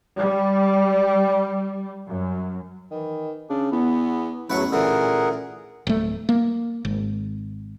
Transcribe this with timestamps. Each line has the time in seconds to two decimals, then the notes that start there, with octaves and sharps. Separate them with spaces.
0.18 G3
2.09 F#2
2.91 D#3 E3
3.50 C#3 D4
3.72 E2 B3
4.50 A1 E2 F#3 A3 B4 F#5 C#6
4.72 A#2 D3 E3 G#4 A#4 F#5
5.87 D1 A3
6.29 A#3
6.85 G#1